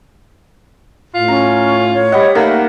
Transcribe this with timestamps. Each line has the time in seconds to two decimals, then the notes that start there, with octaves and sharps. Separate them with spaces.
1.15 A2 F4
1.28 C#4 A#5
1.94 C#5
2.12 G3 D#5 F#5
2.35 D#3 A3 A#3 F#5